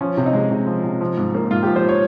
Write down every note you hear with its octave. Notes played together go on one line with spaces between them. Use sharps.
F3 C#4
C3
D#4
G#3
C3
F3
C3
F3
G#2
A#3
G#2 F4
F3 G4
C5
C#5